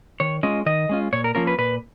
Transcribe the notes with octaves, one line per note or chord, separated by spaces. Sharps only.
D#3 C#5
G#3 C#4 F4 D#5
D#3 D#5
G#3 C#4 F4
A#2 C#5
A#4
F3 A#3 C#4 F4 A#4
B4
A#2 B4